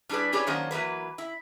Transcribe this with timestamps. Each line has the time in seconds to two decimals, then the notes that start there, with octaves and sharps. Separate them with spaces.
0.09 G3 D4 E4 G#4 B4
0.32 D4 E4 G4 G#4 B4 C#5
0.47 D#3 F#3 A#3 C#4 D4 C5
0.71 E3 F#3 A#3 B4
1.18 E4